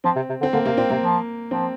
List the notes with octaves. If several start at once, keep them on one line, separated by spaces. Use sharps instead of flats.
F3 C4
C3
C3
D3 C4
D3 A#3
C3 A#3
A#2 C4
C3 A#3
F3
F3 C4